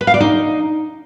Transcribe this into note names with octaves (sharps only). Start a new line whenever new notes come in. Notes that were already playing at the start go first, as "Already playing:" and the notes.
B4
F5
D5
D#4